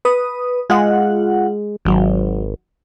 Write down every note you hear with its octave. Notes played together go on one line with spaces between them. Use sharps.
B4 D#6
G#3 F4 F#5
G#1 D#3 F#3